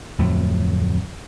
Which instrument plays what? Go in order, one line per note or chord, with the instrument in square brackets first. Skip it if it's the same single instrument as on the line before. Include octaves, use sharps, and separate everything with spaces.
[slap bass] D1 F2 F#3 A3